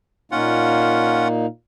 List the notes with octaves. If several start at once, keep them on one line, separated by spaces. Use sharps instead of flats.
A#2 A#3 C#4 D#4 F4 F#5